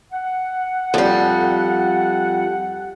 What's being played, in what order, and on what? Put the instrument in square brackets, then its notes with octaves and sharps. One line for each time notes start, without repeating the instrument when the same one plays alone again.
[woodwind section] F#5
[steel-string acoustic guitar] F2 G3